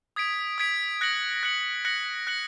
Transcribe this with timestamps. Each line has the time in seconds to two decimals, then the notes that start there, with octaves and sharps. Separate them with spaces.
0.16 D#6 G#6 B6 D7
0.58 D#6 G#6 B6 D7
1.01 F#6 A#6 C#7 F#7
1.43 F#6 A#6 C#7 F#7
1.85 F#6 A#6 C#7 F#7
2.27 F#6 A#6 C#7 F#7